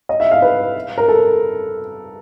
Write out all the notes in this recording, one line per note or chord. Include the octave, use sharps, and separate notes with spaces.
D#5
E5
F5
B4
A#4
A4